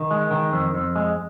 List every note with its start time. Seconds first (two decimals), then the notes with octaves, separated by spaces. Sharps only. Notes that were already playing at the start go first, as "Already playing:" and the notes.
Already playing: D#3
0.11 G#3
0.31 D#3
0.53 F2
0.74 F2
0.96 G#3